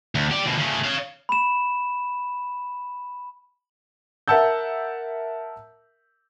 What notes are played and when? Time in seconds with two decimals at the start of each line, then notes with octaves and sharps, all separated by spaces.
0.15 D2
0.31 G4 D5
0.45 D2 B2
0.58 C#3 A3
0.84 C#5 F5
1.29 B5 E7
4.28 A#4 E5 F#5 A5 E6 G6